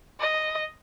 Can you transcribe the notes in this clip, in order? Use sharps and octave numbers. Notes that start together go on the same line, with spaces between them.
D#5